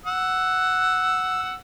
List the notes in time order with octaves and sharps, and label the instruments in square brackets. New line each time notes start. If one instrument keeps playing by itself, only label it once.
[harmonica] F#5 E6